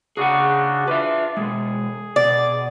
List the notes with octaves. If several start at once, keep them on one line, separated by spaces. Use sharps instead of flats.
C#3 D4 F#4 G#4 F#5
D4 F4 B4 E5
B2 G#3 G#4
B2 D5